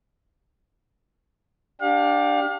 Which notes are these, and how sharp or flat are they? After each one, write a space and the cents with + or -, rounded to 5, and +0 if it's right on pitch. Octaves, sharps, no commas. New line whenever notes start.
D4 +0 G4 +0 F5 +35